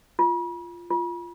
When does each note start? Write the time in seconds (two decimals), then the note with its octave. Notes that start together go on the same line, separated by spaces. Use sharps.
0.19 F4
0.90 F4